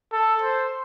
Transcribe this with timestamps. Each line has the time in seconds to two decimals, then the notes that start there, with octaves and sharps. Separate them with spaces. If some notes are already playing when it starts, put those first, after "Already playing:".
0.12 A4
0.42 C5